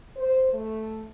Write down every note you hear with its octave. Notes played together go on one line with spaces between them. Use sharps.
C5
A3